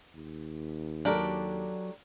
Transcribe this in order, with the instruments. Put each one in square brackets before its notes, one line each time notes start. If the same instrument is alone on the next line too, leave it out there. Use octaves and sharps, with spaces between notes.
[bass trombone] D#2
[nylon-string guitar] F#3 A4 D5 [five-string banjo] D4 G4 A#4